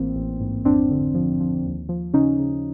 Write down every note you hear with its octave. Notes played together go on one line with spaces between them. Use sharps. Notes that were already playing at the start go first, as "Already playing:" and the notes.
Already playing: A1 E3 A#3 C4
A1
G#2
F2 C4 D4
D3
F3
F3
D#2
F3
C#3 C#4 D#4
C#3